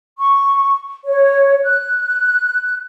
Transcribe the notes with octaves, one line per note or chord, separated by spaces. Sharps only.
C#6
C#5
F#6